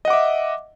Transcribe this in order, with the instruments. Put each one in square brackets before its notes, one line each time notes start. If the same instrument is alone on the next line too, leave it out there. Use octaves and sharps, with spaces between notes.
[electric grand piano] D#5
F#5
D6
E5